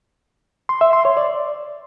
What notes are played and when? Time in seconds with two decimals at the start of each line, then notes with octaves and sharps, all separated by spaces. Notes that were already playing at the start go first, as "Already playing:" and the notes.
0.69 C6
0.81 E5
0.93 C6
1.05 C#5
1.17 D5